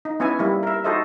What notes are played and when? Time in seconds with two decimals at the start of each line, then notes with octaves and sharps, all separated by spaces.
0.05 D#4
0.20 B3 C#4 E4 E5 G#5
0.39 G3 A#3 E4
0.63 A#4 E5
0.84 D#4 F#4 A4 C5 D#5 E5